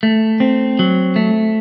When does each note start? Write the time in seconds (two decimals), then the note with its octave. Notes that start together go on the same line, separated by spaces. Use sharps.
0.03 A3
0.40 C4
0.79 F#3
1.16 A3